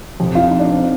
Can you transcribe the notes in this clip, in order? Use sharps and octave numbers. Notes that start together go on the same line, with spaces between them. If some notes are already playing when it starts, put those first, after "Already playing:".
F2 C3 F3
F4
D#4
D4
C4